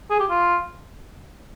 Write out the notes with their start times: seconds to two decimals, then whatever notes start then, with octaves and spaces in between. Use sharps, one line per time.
0.11 G#4
0.20 G4
0.30 F4